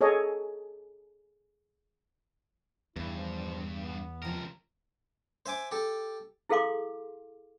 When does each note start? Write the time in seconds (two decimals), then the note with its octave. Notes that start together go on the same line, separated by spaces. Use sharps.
0.01 G#4 A4 C#5 D#5
2.96 E2 G2 E4
3.17 F3
3.82 B3
4.23 C#2 C3 F3 F4 A#4
5.46 C5 E5 G#5 D6
5.71 G4 A4
6.49 E4 G#4 A4 F5 C6 D6